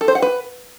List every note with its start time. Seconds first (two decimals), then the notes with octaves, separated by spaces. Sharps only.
0.01 A4
0.08 C5
0.15 F#5
0.22 B4